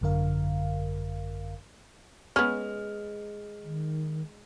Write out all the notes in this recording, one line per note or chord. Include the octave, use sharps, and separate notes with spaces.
G#1 F#2 D3 A#4 F5
G#3 B3 C#4 F6
D#3